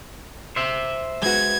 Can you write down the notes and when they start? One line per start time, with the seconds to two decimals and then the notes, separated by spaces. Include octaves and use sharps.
0.56 C5 E5
1.22 G#3 B3 F#4 G#6